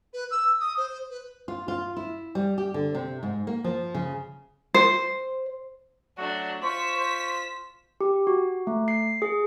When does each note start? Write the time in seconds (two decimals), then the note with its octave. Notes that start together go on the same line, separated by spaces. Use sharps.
0.13 B4
0.30 E6
0.60 D#6
0.77 C5
1.10 B4
1.48 F4
1.68 F4
1.96 E4
2.35 G3
2.58 G4
2.74 D3
2.95 C3
3.23 G#2
3.47 A#3
3.64 F3
3.94 C#3
4.74 C5
6.18 F#3 A3 D4 F#4
6.63 F4 C5 C#6 B6 E7
6.97 C5
8.01 G4
8.27 F#4
8.67 A3
8.88 C7
9.22 G#4